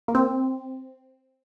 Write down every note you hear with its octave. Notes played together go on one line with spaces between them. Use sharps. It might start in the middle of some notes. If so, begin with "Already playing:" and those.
A#3
C4